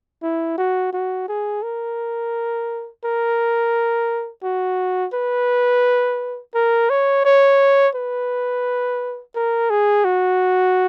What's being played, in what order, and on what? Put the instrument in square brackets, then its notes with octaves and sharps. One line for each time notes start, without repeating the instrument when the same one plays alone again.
[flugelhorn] E4
F#4
F#4
G#4
A#4
A#4
F#4
B4
A#4
C#5
C#5
B4
A#4
G#4
F#4